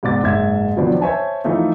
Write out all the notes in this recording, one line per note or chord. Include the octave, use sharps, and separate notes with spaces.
G#2 C3 B3 D5 D6 A6
F#1 G#2 G#3 E5 G#6
C3 D#3 F3 F#3 B3 D4
C5 C#5 E5 G#5 A5
E3 F3 A3 D#4 F4